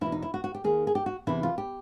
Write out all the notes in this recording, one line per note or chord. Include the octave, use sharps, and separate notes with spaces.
E2 B2 E4
D#4
E4
F#4
F#4
G4
D#2 D#3 G#4
G#4
G4
F#4
E2 C3 E3 E4
F4
G4